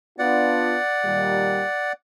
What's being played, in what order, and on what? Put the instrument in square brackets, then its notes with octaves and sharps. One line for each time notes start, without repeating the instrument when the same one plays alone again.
[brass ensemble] B3 D4 F4 [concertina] D5 F#5
[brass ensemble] A#2 D#3 G3